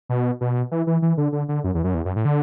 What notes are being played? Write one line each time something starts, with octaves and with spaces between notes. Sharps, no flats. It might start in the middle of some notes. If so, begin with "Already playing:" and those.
B2
B2
E3
E3
E3
D3
D3
D3
F#2
E2
F#2
E2
F#2
A2
D3